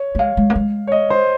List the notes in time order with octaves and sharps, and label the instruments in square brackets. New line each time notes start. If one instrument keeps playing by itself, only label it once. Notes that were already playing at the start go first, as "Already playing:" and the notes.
Already playing: [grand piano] C#5
[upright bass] A#3
[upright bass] G#3 [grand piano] F5
[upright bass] G#3
A#3
G#3
[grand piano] C#5
D#5
C5